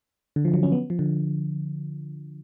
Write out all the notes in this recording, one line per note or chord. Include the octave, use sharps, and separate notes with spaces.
D3
F3
F#3
C#4
B3
F3
D3